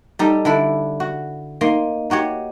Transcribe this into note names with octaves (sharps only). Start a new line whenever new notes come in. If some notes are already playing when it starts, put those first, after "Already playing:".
G3 D#4 G4 A4
D3 D4 E4 B5
F#4
A#3 D#4 C6
D#4 F#4 G4 C#5